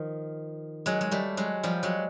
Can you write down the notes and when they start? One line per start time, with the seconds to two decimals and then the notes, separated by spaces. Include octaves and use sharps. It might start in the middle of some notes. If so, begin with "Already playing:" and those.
Already playing: D#3 F3
0.86 F#3 G#3
1.01 G#3
1.11 G3 A3
1.37 F#3 G#3
1.63 F3 G3
1.83 F#3 G#3